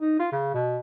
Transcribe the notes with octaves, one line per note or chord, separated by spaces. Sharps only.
D#4
F4
C#3
B2